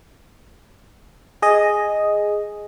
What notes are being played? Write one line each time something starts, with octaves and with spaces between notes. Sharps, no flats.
G#4 D#5